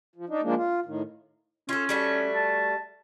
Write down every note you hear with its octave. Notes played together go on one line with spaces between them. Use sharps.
F3
D4 D#4
F3 G#3 A#3 D4
F4
A2 D#3
C#4 F4 A4
G3 A3 F#4
A5